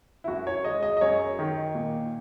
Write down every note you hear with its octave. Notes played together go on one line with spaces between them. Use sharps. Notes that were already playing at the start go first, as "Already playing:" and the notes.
E4
F#2 F#4
C#5
G#3 D#5
D#5
D#5
F#2 C#5
D#3
A#2